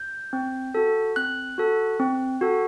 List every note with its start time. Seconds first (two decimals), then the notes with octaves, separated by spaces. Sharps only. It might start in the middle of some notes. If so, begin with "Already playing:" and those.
Already playing: G6
0.33 C4
0.75 F#4 A4
1.16 C4 F#6
1.58 F#4 A4
2.00 C4
2.41 F#4 A4